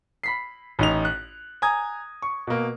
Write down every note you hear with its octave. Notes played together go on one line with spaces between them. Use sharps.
B5 B6 C7
A1 D#4 F7
F#6
G#5 A#5 D#6 G#6
C#6
B2 A#3